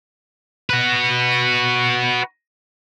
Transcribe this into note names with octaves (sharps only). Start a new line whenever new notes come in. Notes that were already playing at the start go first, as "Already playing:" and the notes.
F#4 B4